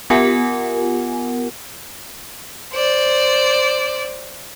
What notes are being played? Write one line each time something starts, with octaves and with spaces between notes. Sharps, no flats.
B3 F4 G4 A#4 F#5 G#5
C5 D5